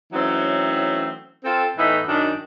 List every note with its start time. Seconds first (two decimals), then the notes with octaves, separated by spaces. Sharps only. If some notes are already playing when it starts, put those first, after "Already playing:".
0.13 E3 F#3 A3 C4 C#4 D#4
1.44 C4 F4 A4
1.77 A2 E3 A3 B3 D#4
2.07 F#2 D#3 D4